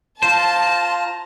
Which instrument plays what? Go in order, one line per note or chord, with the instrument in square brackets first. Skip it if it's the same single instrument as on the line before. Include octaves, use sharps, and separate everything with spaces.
[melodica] F4 A#5 [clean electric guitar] C5 [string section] A5